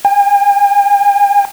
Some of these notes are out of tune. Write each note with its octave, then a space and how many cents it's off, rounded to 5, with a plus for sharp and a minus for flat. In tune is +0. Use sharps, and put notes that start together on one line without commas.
G#5 -45